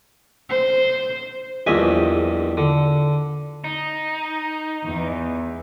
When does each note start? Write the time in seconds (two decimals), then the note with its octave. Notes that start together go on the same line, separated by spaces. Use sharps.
0.49 C5
1.67 A#1 E2 G2 D#5 E5 G#5
2.57 D3
3.64 D#4
4.86 E2